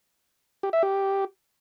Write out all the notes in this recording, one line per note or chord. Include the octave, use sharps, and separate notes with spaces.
G4
E5
G4